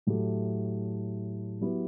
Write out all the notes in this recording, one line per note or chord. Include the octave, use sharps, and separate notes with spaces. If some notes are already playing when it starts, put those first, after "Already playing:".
A2 F#3 A3 E4 G4
F#3 B3 E4 G4